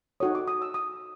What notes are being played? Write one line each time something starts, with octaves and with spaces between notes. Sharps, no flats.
D#4 F#4 A4 C#5 D#6
D6
D#6
E6
D#6